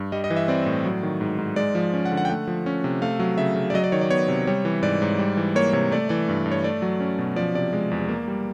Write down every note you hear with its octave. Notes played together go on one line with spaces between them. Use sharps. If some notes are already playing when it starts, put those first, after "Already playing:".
Already playing: G2
G3 D#5
D#5
E3
E5
C4 D5
A2
F#3
D#3
G#2
G#2
G#3 D5
F3
C#4
F#5
D3
F#5
G5
A3 F#5
F3
C#4
C3
A3 F5
F#3
C#3 E5
C#3
D5
F#3 D#5
D5
D#3 C#5
D5
B3 C#5
C3
G3 C#5
E3
G#2 D5
G#2
G3
E3
A#3 C#5
C3 C#5
A3 D5
E3 D5
G2
G2
C#5
A3 D5
F#3
C#4
B2
F3 D5
C3 D5
G#3
E2
A#3
G3